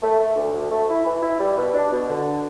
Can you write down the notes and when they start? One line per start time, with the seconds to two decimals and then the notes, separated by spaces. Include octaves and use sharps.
0.03 A3
0.20 A3
0.36 D2
0.53 D2
0.71 A3
0.89 E4
1.06 E3
1.23 E4
1.40 G3
1.57 B2
1.74 D4
1.92 B2
2.08 D3